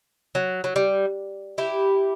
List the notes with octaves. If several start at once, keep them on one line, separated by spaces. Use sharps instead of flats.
F#3
F#3
G3
E4 G4